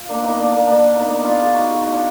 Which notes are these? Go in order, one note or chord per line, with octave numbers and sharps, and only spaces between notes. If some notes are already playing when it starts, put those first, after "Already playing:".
Already playing: F4
A#3 D4
B3 D#4
A#3 D4
A#3 D4
A#3 D4
B3 D#4
A#3 D4
B3 D#4
D4 F4
F4 G#4
D#4 F#4
F4 G#4
D#4 F#4
D4 F4